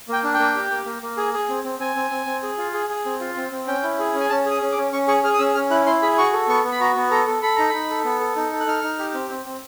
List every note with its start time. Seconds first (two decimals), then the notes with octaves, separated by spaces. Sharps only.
0.09 A#3 G5
0.23 D4
0.34 G5
0.39 A#3
0.55 G4
0.71 A#3
0.86 A#3
1.02 A#3
1.17 G#4
1.34 G#4
1.49 C4
1.64 C4
1.79 C4 G#5
1.96 C4
2.11 C4
2.26 C4
2.43 G#4
2.58 F4
2.74 G#4
2.90 G#4
3.06 C4
3.20 F4
3.37 C4
3.52 C4
3.67 C#4 G5
3.83 E4
3.99 G#4
4.14 C#4
4.20 G#5
4.30 C#4 A5
4.46 G#4
4.51 D#6
4.61 C#4
4.72 D6
4.77 C#4
4.93 C#4 C#6
5.08 G#4 C#6
5.23 G#4 F6
5.34 D#6
5.39 C#4 E6
5.54 C#4 F6
5.70 E4 F#6
5.86 E4 C6
6.02 G#4 B5
6.18 F#4 C#6
6.33 A4
6.48 B3 C#6
6.64 B3
6.72 B5
6.80 F#4 A#5
6.96 B3
7.11 A4 A#5
7.27 A4
7.42 A4 B5
7.56 D#4 A#5
7.69 D#4 B5
7.90 A4
8.05 B3
8.20 A4
8.36 D#4
8.52 A4
8.60 F#6
8.67 D#4 F6
8.84 D#4
8.99 G4
9.14 C4
9.29 C4
9.46 C4